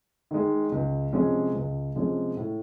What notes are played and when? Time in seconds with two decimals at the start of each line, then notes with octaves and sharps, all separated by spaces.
0.31 D#3 G#3
0.72 C#2
1.13 C3 F3 G#3 C#4
1.55 C#2
1.96 C3 F3 G#3 C#4
2.37 A2